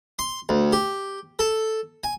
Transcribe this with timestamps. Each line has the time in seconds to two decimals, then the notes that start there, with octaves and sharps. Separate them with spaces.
0.19 C6
0.49 D2
0.73 G4
1.39 A4
2.04 G#5